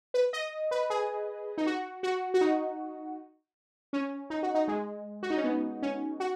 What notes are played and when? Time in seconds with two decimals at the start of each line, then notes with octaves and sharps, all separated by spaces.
0.14 B4
0.33 D#5
0.71 B4
0.90 G#4
1.58 D#4
1.66 F#4
2.03 F#4
2.34 F#4
2.41 D#4
3.93 C#4
4.30 D#4
4.43 F#4
4.55 D#4
4.68 G#3
5.23 F#4
5.30 D#4
5.37 C#4
5.44 B3
5.82 C#4
6.20 F#4